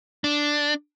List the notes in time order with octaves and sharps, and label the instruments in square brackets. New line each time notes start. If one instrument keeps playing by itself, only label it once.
[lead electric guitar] D4